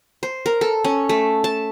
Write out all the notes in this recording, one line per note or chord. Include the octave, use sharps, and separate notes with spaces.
C5
A#4
A4
C#4
A3
A5